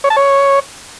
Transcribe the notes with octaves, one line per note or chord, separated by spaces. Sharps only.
C#5
A5
C#5